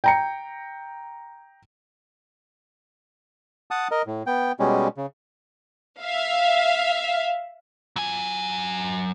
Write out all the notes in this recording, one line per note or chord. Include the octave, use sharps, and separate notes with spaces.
G5 A#5 C#7
F#5 A5 D#6
A#4 D#5
A2
B3 G5
B2 G3 G#3 C#4
C#3
E5 F5
F#3 G#5